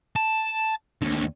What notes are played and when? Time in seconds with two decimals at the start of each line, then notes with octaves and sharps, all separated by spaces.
0.16 A5
1.02 D#2 D3